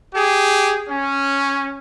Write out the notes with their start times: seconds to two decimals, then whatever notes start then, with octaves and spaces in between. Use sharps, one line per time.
0.14 G4 G#4
0.89 C#4